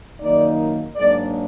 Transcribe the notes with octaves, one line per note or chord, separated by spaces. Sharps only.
F#2 D#3 A#3 D#4 D5
G#2 F#3 A#3 D4 D5